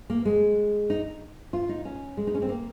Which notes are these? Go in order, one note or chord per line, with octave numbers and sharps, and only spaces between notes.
A#3
G#3
D#4
F4
D#4
C#4
G#3
D#4
C#4
C4
A#3